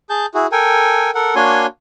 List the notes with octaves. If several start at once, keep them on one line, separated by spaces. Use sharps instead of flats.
G#4 A5 G6
E4 F#4 G#4
A4 A#4 G5 G#5
A4 A#4 F#5
A#3 D4 F#4 C#5 G#5 C6